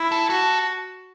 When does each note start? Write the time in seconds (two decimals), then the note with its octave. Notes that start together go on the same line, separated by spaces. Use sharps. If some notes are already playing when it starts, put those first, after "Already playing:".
Already playing: E4
0.12 A4
0.30 F#4 A4